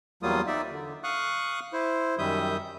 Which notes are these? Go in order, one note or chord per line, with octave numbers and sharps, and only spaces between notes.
E2 F#3 G3 A#3 F4 D#6
D#4 D5 E5
D3
F5 C#6 D#6 F#6
E4 C5
F#2 D#3 G3 E5 D#6 G6